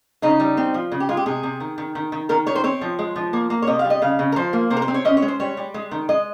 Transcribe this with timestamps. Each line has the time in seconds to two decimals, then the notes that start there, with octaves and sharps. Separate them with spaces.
0.22 C#3 D#4
0.40 G3
0.57 C4
0.74 F3
0.92 C#3
1.00 G4
1.09 G#3 F4
1.17 G4
1.26 C3 G#4
1.43 C3
1.60 D#3
1.78 D#3
1.95 D#3
2.12 D#3
2.29 D#3 A#4
2.46 D#3 C#5
2.55 C5
2.64 C4 C#5
2.81 F3
2.99 G#3
3.16 F3
3.33 A#3
3.50 A#3
3.62 C#5
3.67 C3 D#5
3.79 F5
3.84 G3
3.90 D#5
4.02 C#3 F5
4.19 C#3
4.32 A#4
4.36 F3 C5
4.53 A#3
4.70 C3 C5
4.77 A#4
4.82 C5
4.88 C4
4.94 C#5
5.05 C#4 D#5
5.17 C#5
5.22 G#3
5.28 C5
5.40 G3 C#5
5.57 G3
5.74 G#3
5.91 D#3
6.09 G#3 D#5